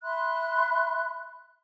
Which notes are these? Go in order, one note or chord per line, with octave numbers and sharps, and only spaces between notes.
E5 B5 C6 F#6